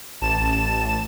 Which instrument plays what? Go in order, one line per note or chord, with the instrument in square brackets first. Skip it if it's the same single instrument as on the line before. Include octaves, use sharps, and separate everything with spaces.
[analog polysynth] A1 A5 E7